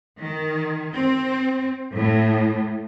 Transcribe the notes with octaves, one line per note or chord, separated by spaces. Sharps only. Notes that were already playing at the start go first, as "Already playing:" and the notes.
D#3
C4
A2